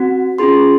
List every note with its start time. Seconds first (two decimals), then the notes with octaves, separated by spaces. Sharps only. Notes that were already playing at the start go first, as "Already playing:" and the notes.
Already playing: C4 F#4
0.38 C#4 F4 G#4 C6